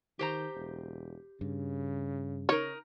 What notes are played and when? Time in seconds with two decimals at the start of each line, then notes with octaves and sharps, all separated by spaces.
0.19 D#3 G4 C5 A#5
0.55 E1
1.41 G2 C#3
2.49 D#4 A#4 C#5